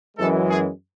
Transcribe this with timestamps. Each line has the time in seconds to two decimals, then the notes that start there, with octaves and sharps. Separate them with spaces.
0.17 F#2 E3 G#3 A4
0.49 G#4